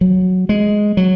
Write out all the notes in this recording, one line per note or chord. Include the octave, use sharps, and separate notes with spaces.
F#3
G#3
F#3